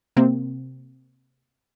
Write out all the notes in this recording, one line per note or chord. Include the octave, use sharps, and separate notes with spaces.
C3 A#3 C4